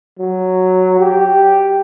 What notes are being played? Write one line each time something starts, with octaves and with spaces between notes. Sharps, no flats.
F#3
G4